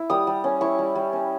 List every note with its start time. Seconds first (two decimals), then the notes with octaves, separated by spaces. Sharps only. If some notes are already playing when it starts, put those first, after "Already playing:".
Already playing: E4
0.10 G3 D#6
0.27 G3
0.44 C#4
0.61 E4 C#6
0.79 G3
0.95 G3
1.13 C#4